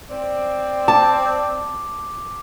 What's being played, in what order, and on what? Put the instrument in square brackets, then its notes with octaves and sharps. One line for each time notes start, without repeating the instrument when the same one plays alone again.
[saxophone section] C4 D5
[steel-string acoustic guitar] A5 [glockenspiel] D6